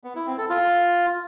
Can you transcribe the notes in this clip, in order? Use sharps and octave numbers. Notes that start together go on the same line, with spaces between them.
B3
E4
C4
A4
F4